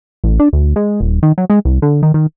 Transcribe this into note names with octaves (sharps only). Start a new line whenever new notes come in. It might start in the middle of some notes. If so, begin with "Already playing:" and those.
A1
D4
D2
G#3
D#1
D#3
F#3
G#3
C2
D3
D#3
D#3